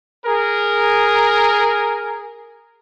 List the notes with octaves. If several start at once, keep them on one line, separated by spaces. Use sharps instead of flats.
G#4 A#4